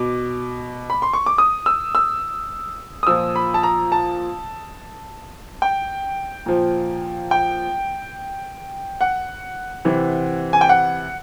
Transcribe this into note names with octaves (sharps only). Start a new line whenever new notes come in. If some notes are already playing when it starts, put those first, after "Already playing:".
Already playing: B2 D6
B5
C6
C#6
D6
D#6
E6
E6
D#6
A#2 F3 E6
B5
A5
A#5
A5
G5
A#2 F3
G5
F#5
C3 E3
G#5
G5
F#5